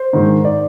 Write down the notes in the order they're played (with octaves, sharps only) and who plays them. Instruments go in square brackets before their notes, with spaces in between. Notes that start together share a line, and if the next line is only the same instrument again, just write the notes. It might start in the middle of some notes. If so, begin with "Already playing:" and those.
Already playing: [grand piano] C5
G#2 D#3 G#3
D5